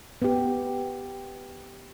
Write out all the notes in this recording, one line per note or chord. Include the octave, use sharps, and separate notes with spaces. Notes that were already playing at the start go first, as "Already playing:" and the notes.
B3 G4